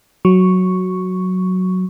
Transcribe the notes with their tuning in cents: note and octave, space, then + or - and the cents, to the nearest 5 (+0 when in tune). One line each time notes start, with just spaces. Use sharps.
F#3 +0 C#6 +0